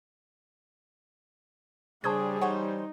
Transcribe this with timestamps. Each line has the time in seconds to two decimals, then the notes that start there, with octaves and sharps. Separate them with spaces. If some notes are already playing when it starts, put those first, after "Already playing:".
2.04 C#3 G3 D4 G#4 C5 A5 D#6 G#6
2.41 E3 D#4 C5 C#5 F#5